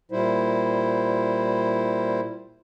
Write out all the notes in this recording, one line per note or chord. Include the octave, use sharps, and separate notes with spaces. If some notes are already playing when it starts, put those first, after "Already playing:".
A#2 G3 E4 C5